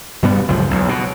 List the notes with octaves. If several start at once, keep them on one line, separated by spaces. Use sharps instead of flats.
G2 B2 G3 B3
G1 C#2 F#2 F3
B1 E2
B2